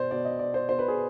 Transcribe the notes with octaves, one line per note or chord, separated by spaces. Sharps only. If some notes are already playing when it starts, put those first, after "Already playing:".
Already playing: B2 C5 D5
B2 D5
D#5
D5
C5
B2 C5
B4
G#4